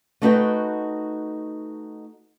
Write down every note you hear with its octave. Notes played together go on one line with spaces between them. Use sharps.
A3 D#4 F#4 B4 D#5 G5